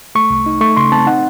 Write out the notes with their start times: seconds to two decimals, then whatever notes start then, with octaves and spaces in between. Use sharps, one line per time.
0.15 A3 C#6
0.30 C2
0.46 D#4
0.61 A3 C#6
0.77 C#3 C6
0.92 C4 A5
1.07 D#4 F#5